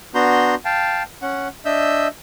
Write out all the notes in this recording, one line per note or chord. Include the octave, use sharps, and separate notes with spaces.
B3 D4 F#4 A#5 C6 G6
F5 G5 A5
C#4 F#5
D4 D#5 E5 E6 G6